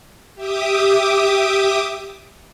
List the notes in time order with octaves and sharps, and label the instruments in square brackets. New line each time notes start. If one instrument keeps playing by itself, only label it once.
[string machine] G4 E5 D6 D#6